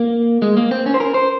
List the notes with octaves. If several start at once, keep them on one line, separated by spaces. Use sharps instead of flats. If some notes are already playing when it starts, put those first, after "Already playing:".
Already playing: A#3
G#3
A#3
C4
C#4
C5
A#4
C5